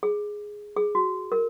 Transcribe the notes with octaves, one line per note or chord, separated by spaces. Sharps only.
G#4
G#4
F#4
A#4